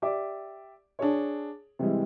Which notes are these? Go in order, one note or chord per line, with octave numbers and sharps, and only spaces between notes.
G4 D5 E5 D6
D4 G#4 C#5
C3 E3 G3 G#3